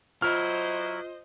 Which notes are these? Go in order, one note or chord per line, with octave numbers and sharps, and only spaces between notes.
F#3 E4 F4 C5 D#5 F6